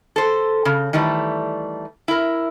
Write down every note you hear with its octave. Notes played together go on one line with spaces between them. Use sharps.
A4 C5
C#3
D#3 E3 G3 A3
E4 A#4